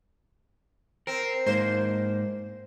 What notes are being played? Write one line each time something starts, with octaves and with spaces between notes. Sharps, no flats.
C4 A#4
G#2 A#3 C5